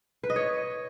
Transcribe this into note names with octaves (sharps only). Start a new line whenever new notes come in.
B4
D#5
C#5